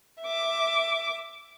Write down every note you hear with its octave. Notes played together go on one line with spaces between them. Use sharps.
E5 D6